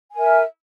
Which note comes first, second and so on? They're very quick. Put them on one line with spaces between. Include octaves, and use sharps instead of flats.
G#5 A#4 E5